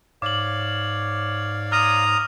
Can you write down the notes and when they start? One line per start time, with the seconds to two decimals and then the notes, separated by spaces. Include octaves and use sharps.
0.22 G#2 C#5 D5 F5 D6 F#7
1.72 A#5 D#6 F6